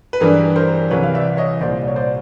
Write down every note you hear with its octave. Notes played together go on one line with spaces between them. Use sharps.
B4
G2 E3 G3 G#4 A#4
A#4 C5
C2 C3 E3 B4 C#5
F5
D5 E5
C#5 D#5
C2 A#2 G3 C5 D5
C#5
C5 D5